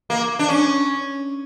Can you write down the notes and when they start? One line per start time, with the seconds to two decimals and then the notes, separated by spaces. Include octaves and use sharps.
0.10 A#3
0.39 D4
0.49 C#4